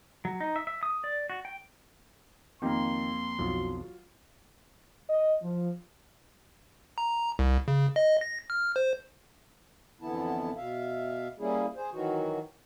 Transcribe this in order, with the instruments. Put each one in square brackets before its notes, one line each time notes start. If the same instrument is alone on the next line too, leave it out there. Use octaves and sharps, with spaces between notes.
[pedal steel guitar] F#3
D#4
E5
E5
D#6
D5
F#4
G5
[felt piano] F2 A#3 [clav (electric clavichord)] D#3 G4 [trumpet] C6
[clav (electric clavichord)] B1 F2 [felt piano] F#3 F4
[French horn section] D#5
F3
[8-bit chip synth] A#5
C2
C#3
D#5
A#6
F6
C5
[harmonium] F2 D3 E3 B3 E4 A5
B2 E5 F5
G3 A#3 C#4 E4 G#4
G#4 C5
D#3 E3 F#3 F#4